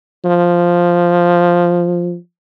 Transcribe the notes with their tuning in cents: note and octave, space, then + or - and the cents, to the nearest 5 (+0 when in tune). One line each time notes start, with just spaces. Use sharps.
F3 +0